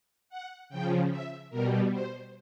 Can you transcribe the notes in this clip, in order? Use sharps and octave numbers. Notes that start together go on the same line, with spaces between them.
F#5
C#3 F3 G5
E5
B2 G3 A#4
C5